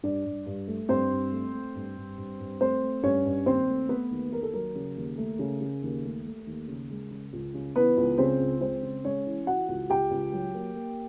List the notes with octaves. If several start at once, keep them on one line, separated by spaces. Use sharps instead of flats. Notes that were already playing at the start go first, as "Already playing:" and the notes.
G2 D4 D5
G2
G2
A3
G2 C4 C5
G2
A3
A3
G2
G2
G2
G2
A3 C4 C5
A3
G2 C#4 C#5
G2
D#2 C4 C5
A3
A3 B3 B4
D#2
D#2 A#4
A4
F#3 A#4
C#3
D#2
A3
C#3
C#3
D#2
A3
A3
D#2
C#3
G#3
C#3
C#2
C#3
E3 B3 B4
C#2
C#3 C4 C5
C#2
G#3 C4 C5
C#3
G#3 C#4 C#5
E3
E3 F#4 F#5
C#2
C#2 G4 G5
C#2
F#3
A#3
A#3